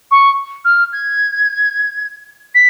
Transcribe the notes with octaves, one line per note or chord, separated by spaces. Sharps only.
C#6
F6
G#6
B6